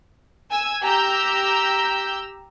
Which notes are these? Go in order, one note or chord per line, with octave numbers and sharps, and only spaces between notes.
G#5 E6
G4 A#5 E6 G6